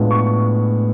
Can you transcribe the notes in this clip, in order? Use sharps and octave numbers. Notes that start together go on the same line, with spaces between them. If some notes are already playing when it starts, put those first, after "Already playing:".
Already playing: A2 G#3 B3 D4 F4
C#6